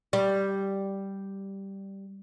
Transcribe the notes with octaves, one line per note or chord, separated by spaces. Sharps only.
G3